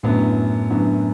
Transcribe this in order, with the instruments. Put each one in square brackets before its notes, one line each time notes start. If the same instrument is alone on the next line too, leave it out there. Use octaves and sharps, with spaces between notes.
[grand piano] F#2 D3 F#3 B3 E4 [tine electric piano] A2
[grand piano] F#2 D3 F#3 B3 E4